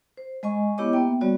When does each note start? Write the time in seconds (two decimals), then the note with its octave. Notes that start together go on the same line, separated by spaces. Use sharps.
0.17 C5
0.43 G#3 D#5 G#5 C#6
0.78 B3 E4 G4 C#5 D#5 D6
0.93 A#3 B3 E5 G5
1.21 G3 B3 F#4 C#5 D5